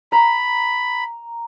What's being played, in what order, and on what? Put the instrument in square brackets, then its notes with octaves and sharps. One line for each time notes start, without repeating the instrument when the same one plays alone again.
[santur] A#5 [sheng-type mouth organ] B5